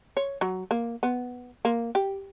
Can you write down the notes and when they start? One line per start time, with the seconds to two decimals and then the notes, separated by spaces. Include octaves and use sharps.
0.17 C#5
0.41 F#3
0.71 A#3
1.03 B3
1.65 A#3
1.95 G4